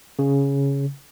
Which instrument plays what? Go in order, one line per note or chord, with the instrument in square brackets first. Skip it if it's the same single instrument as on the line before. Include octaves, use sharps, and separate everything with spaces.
[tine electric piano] C#3